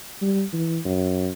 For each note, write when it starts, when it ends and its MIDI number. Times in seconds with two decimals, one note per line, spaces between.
0.22 0.44 55
0.53 0.78 52
0.85 1.31 42